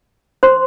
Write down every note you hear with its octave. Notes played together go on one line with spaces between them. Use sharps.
C5 C6